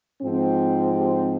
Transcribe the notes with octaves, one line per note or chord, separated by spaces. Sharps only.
G#2 F3 C4
G4